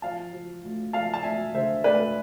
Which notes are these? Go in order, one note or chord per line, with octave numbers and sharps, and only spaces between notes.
F3 F5 A5
F3
D2
F3 F5 A5
A5
D2 E5 G#5
D3 C5 E5
D2 B4 D5